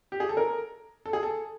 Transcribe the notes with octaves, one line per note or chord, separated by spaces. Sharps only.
G4
G#4
A4
A#4
A4
G#4
A4